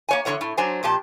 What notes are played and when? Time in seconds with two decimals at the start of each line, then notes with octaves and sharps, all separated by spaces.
0.09 A#3 C#5 G#5
0.25 E2 D3 F3 C#5 F#5
0.41 A2
0.57 F#3 D4 C5 G#5
0.83 F2 A#2 G4 A5